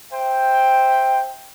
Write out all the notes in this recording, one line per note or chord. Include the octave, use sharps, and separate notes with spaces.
C5 E5 G5